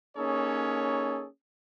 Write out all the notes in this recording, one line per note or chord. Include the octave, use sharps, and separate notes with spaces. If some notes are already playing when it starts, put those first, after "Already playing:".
A#3 C#4 D#4 G#4 A4 C#5